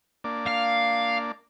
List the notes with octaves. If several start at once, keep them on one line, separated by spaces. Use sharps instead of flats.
A#3 D4 D5
F5